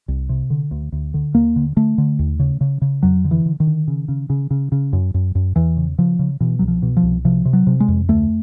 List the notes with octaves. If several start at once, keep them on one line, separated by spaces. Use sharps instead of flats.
C2
C3
D3
D2
D2
D3
D#2 A#3
D3
D3 A3
D3
D#2
C#3
C#3
C#3
F2 F#3
D3
E3
D3
D#3
D3
C#3
C#3
C#3
C#3
C#3
F#2
F#2
F#2
E2 E3
C#3
C#3 F3
C#3
B2 E3
C2 F#3
F3
B2
F3
C2
C3 F3
C3
F#3
C3
G#3
F2
D2 A3